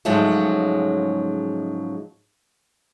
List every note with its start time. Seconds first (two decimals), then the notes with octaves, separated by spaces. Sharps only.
0.05 G#2 C#3 F3 F#3 G#3 A3